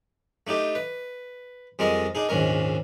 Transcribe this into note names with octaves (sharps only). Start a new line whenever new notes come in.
A3 D4 D#4 G4
B4
F2 G3 G#3 A#4 D#5
D4 D#4 G#4
A#1 D#2 G#2 C#4 A#4